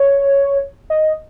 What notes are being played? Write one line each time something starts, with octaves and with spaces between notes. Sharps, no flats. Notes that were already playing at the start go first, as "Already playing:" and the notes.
Already playing: C#5
D#5